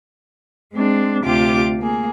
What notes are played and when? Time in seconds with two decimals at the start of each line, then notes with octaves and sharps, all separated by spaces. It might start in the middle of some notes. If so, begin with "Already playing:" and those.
0.73 G#3 C4 D4
1.23 D2 C3 D4 F4 G4 D6
1.78 A#3 G#4